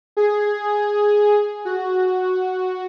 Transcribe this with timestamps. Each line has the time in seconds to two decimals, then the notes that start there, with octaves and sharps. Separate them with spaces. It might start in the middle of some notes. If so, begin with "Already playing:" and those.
0.17 G#4
1.65 F#4